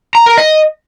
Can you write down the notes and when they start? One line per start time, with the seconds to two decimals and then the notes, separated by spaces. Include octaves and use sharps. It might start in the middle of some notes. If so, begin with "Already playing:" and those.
0.15 A#5
0.26 A#4
0.38 D#5